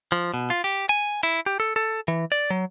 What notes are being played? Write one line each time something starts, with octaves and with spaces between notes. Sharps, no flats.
F3
B2
F4
G4
G#5
E4
G4
A4
A4
E3
D5
F#3